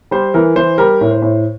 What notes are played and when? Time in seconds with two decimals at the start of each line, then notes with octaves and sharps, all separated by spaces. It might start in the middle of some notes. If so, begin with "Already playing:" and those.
0.11 G3 C5
0.34 E3 A#4
0.56 E3 C5
0.78 G3 A#4
1.01 A2
1.11 C5
1.22 A2